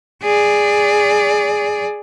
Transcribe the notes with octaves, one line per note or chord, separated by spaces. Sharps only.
G#4 D5